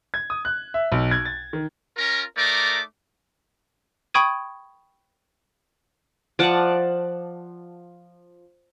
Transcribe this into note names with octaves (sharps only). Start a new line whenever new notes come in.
G#6
D#6
F#6
E5
B1
G#6
A6
D#3
C#4 F4 A#4
A3 D#4 A#4 D5 D6
G5 B5 C#6 D#6 G#6 D#7
F3 D5 F#5 A5